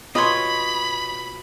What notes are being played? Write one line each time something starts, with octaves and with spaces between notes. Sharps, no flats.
B2 C4 F4 C#5 D#5 F#5 B5 C6